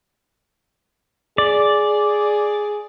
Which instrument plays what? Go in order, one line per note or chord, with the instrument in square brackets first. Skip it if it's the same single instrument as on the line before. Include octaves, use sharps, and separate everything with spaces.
[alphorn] G#4 [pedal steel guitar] D5